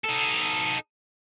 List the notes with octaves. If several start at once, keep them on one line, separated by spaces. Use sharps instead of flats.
D#4 A4